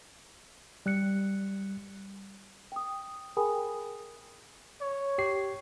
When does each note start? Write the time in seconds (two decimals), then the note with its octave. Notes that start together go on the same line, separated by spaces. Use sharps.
0.86 G3 F#6 C#7
2.72 G5 D#6
3.37 G#4 A#4 G5 G#5 B5 D#6
4.81 C#5
5.18 G4 C7